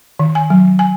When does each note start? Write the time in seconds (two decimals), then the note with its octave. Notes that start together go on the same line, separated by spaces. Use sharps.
0.19 D#3
0.35 G#5
0.50 F#3
0.79 G#5